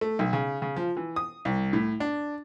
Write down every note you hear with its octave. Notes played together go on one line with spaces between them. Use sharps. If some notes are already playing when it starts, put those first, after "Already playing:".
A3
B1
C#3
C#3
F3
E3
D#6
C2
A2
D4